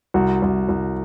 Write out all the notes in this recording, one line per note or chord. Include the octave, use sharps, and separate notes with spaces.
C2 F#4
C2
C2